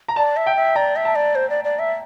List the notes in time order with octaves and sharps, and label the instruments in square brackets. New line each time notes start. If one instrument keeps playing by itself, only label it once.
[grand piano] A#5
[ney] D5 [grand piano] A5
[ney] E5
[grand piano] G5
[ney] E5
[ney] D5 [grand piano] A#5
[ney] E5
[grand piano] A5
[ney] D5
C5
D5
D5
E5